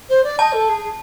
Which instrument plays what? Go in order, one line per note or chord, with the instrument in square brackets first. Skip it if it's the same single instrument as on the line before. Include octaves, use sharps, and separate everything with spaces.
[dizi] C5
D5
[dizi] D#5 [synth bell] A5
[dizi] A4
G#4
G#4